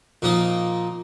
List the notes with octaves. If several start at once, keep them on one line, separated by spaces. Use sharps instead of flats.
A#2 F3 A#3 D#4